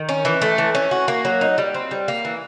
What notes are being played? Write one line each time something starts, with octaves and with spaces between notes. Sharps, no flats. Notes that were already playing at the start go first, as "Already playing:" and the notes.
Already playing: D#3
C#4
E3
A3
E3
C#4
F#4
A#3
F#3
D#4
G3
C4
G3
A#3
E3